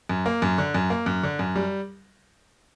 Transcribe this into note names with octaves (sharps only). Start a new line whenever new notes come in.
F#2
A#3
F#2
D3
F#2
A#3
F#2
D3
F#2
G3